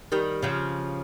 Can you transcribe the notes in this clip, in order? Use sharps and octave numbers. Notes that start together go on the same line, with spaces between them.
D#3 G3
C#3 F3